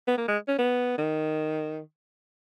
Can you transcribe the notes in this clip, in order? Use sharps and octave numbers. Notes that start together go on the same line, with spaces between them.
B3
A#3
G#3
C#4
B3
D#3